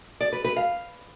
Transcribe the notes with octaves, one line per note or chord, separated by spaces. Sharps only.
D5
B4
B4
F5